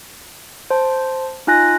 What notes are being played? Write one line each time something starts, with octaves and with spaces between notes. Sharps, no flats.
C5 A5
D#4 F4 G#5 F#6 A#6